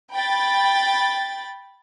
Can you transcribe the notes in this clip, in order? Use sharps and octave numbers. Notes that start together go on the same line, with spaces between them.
G5 B5 A6